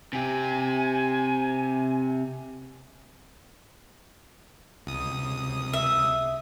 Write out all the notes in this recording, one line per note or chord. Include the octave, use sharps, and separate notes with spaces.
C3 G4 G#5
C#2 C3 D#6
E5